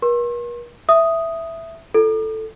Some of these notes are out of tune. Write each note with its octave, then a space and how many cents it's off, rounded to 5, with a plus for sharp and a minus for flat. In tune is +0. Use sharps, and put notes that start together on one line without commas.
A#4 +45 C6 +45
E5 +0 D#6 +0
F4 -25 A4 +0